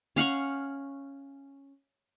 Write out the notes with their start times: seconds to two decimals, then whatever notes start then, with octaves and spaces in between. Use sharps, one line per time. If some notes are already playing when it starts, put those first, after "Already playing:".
0.16 C#4 F5 F#5 C#6